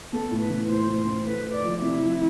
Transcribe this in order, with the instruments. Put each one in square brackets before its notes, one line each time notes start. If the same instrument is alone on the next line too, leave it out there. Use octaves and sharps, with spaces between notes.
[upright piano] B3 [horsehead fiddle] A4
[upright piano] A2
[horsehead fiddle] B4
[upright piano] E3
[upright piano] A2 [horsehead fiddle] C5
[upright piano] A2
[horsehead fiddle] C5
[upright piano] E3
[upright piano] A3 [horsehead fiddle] B4
[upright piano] A3
[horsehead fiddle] D5
[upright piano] F3
[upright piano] C3 [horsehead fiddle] E4
[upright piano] F3